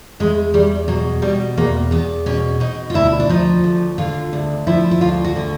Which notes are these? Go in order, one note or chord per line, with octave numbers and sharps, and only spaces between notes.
E2 G#3
E2 G3
B2 F#3
B2 G3
E2 A#3
E2 B3
B2 C#4
B2 D#4
F4
D2 E4
D4
F3 D#4
D2
D3 F4
D2
F3 E4
E4
D2 F4
F#4
D3